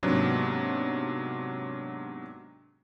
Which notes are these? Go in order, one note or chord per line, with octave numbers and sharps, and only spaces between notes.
G#2 C3 F#3 A#3 B3 D4